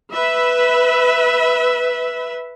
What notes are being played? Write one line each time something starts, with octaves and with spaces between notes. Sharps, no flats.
B4 E5